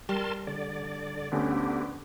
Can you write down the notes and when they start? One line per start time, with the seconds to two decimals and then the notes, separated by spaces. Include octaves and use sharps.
0.09 G3 A#4 A5 C6
0.47 D3 D5
1.32 D2 D3 B3 C#4 G4